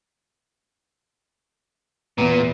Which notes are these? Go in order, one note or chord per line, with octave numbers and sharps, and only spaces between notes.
E2 A#2 B3